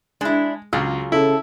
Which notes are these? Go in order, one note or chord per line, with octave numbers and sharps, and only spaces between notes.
G#3 D4 E4
C#2 F#3 F4 G#4
C#3 E4 A4